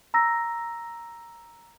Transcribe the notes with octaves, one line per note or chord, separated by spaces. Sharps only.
A#5 E6 A#6